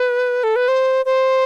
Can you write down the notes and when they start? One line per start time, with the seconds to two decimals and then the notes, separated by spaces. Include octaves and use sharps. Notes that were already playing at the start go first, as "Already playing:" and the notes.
Already playing: B4
0.43 A4
0.56 B4
0.68 C5
1.05 C5